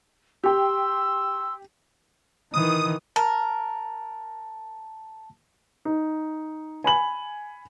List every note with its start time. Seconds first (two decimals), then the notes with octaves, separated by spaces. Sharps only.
0.44 G4 G5 C6 E6
2.54 D#3 E3 D#6
3.16 A#4 A5
5.85 D#4
6.84 G#5 B5 F#7